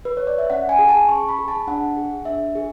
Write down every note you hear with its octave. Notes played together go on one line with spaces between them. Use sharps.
B4
C#5
D5
E5
C#4 F#5
G#5
G#4
A5
C#4 C#6
B5
G#4
A5
D4 F#5
G#4
D4 E5
G#4